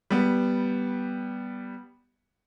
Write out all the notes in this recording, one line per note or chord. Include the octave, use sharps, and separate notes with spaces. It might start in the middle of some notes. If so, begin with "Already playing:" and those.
G3 B3